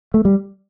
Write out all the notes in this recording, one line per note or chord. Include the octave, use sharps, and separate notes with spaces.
A3
G3